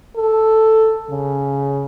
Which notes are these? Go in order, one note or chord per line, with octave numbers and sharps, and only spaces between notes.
A4
C#3